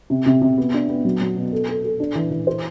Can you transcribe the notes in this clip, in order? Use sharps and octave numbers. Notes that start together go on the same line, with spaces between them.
C3
C3
C3
B3
D4
B3
F#3
F#3
B2
A4
A4
A4
D4
E3
E3
C5